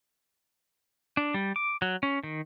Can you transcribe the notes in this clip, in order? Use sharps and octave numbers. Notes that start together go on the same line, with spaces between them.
D4
G3
D6
F#3
C#4
D#3